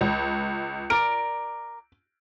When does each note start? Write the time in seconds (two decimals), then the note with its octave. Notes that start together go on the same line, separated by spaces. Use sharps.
0.01 C#2
0.90 A#4 D5 D7